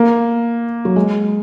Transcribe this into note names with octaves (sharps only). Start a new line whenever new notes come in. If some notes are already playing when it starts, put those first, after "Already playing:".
Already playing: A#3
F#3
G#3